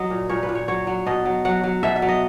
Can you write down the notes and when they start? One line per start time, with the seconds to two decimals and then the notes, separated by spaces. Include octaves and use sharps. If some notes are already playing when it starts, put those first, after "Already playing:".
Already playing: F#3 D#5
0.10 A#2
0.29 A#2 C#5
0.43 B4
0.49 A#2
0.55 C#5
0.68 F#3 C#5
0.87 F#3
1.06 B2 D#5
1.25 F#3
1.45 F#3 F#5
1.63 F#3
1.83 B2 E5
1.96 E5
2.02 F#3
2.08 D#5